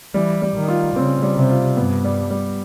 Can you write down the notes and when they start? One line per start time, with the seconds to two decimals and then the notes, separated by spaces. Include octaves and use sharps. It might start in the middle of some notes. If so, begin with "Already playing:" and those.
0.14 E3 G3
0.42 G3
0.55 D#3
0.68 F4
0.95 C#3 C4
1.22 G3
1.36 C3
1.49 F4
1.77 G2 B3
2.04 G3
2.31 G3